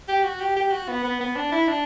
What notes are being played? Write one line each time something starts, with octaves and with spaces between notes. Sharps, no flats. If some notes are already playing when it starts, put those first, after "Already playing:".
G4
F#4
G4
G4
F#4
B3
B3
B3
D4
E4
D4